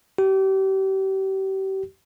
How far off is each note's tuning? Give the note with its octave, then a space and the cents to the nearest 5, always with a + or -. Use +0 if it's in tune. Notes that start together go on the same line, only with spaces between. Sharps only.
G4 -35